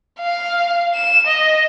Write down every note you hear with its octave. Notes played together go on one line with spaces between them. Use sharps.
F5
E7
D#5